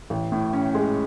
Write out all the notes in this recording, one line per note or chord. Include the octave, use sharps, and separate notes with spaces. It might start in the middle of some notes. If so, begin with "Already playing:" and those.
A1
A2
C#4
G#3